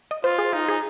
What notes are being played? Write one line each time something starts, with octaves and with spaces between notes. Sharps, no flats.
D#5
F4 C5
G#4
D#4 F4
G#4